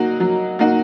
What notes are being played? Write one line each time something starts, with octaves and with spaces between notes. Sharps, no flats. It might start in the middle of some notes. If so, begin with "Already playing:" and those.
Already playing: F#3 A#3 D#4 F#4
F#3
A#3 D#4 F#4